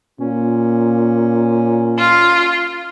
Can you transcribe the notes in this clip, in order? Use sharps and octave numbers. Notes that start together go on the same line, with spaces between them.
A#2 C#4
F4